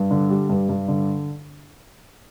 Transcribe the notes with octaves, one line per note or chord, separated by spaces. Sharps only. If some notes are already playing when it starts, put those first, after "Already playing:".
Already playing: G2
D3
G3
G2
G2
D3